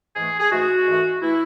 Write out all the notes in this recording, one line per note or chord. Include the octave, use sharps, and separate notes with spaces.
G#2 E3 A3 G#4
G#4
G#2 E3 A3 F#4
G#2 E3 A3
E3 A3 E4